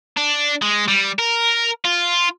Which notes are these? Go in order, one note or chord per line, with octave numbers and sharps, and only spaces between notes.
D4
G#3
G3
A#4
F4